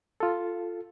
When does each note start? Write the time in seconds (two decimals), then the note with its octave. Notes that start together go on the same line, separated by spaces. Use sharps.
0.20 F4 A4